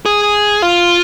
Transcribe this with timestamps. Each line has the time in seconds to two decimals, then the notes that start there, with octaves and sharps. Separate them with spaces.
0.06 G#4
0.62 F4